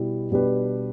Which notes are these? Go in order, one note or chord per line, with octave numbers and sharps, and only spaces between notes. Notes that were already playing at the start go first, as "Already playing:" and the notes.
Already playing: B2 G3 E4
B2 G3 D4 G4 B4